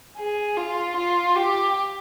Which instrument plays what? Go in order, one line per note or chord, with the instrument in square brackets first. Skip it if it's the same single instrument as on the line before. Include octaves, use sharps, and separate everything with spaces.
[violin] G#4
F4
F4
G4